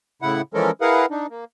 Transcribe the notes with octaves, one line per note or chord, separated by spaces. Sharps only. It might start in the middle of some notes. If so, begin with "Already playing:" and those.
A2 C#3 E4 F#5
E3 F3 G#3 C#4 A4 A#4
E4 G#4 A#4 B4 F5 F#5
D4 D#4
A#3